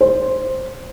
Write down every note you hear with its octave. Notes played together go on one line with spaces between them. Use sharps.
C5